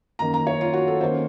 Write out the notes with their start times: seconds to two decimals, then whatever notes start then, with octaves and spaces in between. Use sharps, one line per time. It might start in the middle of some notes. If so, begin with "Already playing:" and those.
0.19 F#2 D#3 A#3 A#5
0.34 A#5
0.47 C#5
0.61 F4
0.73 F#4
0.88 A4
1.01 D#3 A#3 C#4 C5